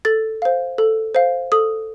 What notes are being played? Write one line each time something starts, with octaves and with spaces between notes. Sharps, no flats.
A4 A6
C5 F5
A4
C5 F5
A4 D#6